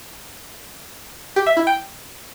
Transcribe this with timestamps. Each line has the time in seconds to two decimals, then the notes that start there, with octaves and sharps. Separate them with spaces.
1.36 G4
1.46 E5
1.57 E4
1.67 G5